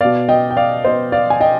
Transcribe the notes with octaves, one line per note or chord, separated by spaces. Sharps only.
B2 B3 D5 F5
D#5 G5
G5
D5 F5
B2 B3 C5 D#5
D5 F5
G#5
D#5 G5